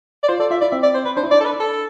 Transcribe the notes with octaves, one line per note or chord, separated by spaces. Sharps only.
D5
F4 C5
A4 D5
F4 E5
E4 D5
C4 E5
D5
C5
B4
D4 C5
E4
D4 D5
A4
B4
A4